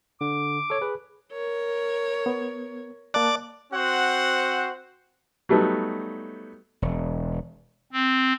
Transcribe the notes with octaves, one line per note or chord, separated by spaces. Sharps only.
D3 D6
A4 C#5
G#4 B4
A#4 C#5
B3
A#3 D5 A5 F#6
C4 F#4 C5 F#5
F#3 G3 A3 B3 D#4
E1
C4